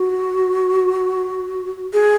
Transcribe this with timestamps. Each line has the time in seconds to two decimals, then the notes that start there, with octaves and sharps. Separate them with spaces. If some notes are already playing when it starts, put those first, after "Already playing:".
Already playing: F#4
1.93 G#4